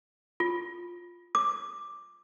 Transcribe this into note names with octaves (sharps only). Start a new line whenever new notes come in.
F4
D6